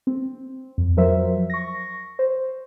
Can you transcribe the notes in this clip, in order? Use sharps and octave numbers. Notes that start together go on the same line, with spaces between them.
C4
F2
F3 F#3 A#4 C5 E5
C#6 A#6
C5